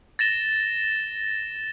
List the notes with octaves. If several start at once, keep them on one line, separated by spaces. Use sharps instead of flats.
A6 A#6 E7 G7